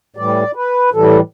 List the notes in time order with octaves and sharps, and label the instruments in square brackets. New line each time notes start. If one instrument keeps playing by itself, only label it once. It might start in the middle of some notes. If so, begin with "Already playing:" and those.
[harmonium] A2 E3 G3 D5
B4
A2 E3 G3 A4